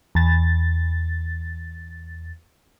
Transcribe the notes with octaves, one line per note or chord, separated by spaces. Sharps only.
E2 A6